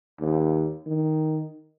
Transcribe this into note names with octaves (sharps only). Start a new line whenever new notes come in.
D#2
D#3